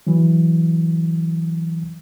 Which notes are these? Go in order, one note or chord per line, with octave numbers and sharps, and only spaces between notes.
E3 F#3